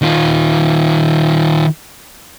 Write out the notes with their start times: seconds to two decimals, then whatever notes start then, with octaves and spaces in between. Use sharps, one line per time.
0.02 D#3 F4